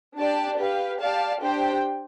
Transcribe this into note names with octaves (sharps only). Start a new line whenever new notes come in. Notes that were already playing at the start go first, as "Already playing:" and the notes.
D4 G4 D5 A5
G4 B4 F5
G4 D5 F5 A5
D4 G4 C5 G5